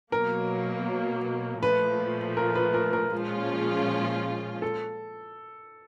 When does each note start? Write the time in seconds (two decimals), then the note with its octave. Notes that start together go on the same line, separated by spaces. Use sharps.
0.12 B2 F#3 A#3 A#4
1.62 A#2 F3 A3 B4
2.37 A#4
2.56 B4
2.74 A#4
2.93 A#4
3.12 A#2 F3 G#3 C#4 F4
4.62 A4